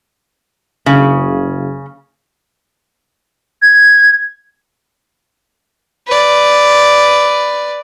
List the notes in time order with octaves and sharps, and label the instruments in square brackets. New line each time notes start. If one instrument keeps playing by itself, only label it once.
[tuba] F#1 [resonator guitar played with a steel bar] C#3
[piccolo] G#6
[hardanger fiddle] B4 D5